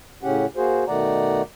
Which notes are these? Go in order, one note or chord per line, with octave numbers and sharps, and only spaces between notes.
A2 C#3 C#4 G4 F#5
A#3 F#4 G#4 C5
B2 D#3 A3 D5 F#5 A#5